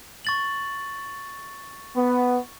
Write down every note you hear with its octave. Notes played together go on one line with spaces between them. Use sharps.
C#6 A6 F#7
B3